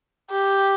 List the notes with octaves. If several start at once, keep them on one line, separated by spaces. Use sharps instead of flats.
G4